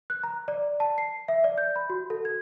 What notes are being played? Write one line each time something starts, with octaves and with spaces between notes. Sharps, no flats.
F#6
A#5
D5
A5
C7
E5
D5
G6
B5
F#4
A4
G#6